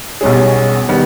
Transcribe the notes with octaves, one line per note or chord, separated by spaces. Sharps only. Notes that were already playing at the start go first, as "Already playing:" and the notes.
B1 B2 G3 C#4 G#4
D#3 G3 B3